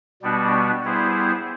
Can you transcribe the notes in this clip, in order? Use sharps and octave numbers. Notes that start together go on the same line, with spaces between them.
B2 G3 B3 D4 F#4
G3 B3 E4 G#4 C5